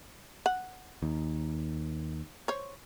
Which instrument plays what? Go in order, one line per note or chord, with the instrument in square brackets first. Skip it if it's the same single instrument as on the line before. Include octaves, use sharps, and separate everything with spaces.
[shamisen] F#5
[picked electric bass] D#2
[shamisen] C5 C#5